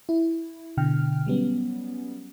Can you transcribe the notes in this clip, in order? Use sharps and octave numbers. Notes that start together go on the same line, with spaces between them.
E4
B2 D3 G5 F6
F#3 G3 B3 C#4